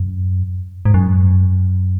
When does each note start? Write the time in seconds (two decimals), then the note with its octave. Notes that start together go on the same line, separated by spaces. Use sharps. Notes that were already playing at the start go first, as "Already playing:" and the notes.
Already playing: F#2
0.85 G#2
0.94 F#2